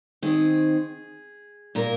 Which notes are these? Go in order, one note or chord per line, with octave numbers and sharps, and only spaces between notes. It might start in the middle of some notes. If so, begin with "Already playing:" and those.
D#3 C4 G#4
A#2 A#3 A#4